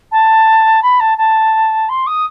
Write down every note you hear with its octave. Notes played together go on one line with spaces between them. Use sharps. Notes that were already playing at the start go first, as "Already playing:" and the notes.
A5
B5
A5
A5
C6
D#6